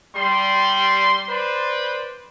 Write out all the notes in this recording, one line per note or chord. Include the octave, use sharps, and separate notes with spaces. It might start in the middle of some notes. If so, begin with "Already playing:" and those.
G3 C6
B4 C5 D5 C6